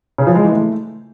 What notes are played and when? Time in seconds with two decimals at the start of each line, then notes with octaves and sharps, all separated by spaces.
0.18 C#3
0.27 F3
0.35 G#3
0.44 E3
0.52 A3